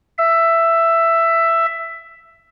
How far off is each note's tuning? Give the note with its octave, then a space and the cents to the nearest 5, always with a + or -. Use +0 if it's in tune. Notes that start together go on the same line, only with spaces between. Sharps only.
E5 +10